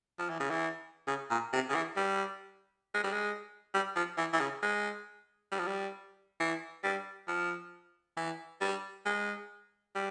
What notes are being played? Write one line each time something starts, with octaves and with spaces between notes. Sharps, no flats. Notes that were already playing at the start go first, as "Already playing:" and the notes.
F3
E3
C#3
E3
C#3
A#2
C3
C#3
E3
G3
G#3
G3
G#3
G3
F3
E3
E3
C#3
G#3
G3
F3
G3
E3
G3
F3
E3
G3
G#3
G3